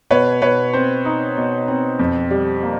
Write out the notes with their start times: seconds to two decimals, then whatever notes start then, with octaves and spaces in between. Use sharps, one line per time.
0.11 B2 B4 C#5
0.42 B2 B4 C#5
0.73 C4 C5
1.05 D#4
1.37 B2
1.68 C4
1.99 F2
2.31 G3
2.63 A#3